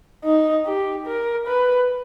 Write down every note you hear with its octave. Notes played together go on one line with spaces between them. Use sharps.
D#4
G4
A#4
B4